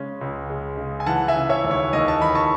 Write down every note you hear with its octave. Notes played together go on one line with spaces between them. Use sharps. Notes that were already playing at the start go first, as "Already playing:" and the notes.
Already playing: C#3 G#3 C#4
C#2
G#3
C#3
G#5
E3 F#5 A5
E5 G#5
C#3
C#5 E5
D#2
C#5
D#2 D#5
A5
E3 B5
A5 C#6